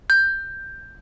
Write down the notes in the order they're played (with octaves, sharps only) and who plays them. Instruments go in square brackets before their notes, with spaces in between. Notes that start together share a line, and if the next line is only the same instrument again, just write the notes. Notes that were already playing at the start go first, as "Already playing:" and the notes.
[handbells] G6